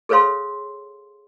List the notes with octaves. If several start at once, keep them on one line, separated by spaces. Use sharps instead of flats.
G#4 A4 B4 C#5 F5 C6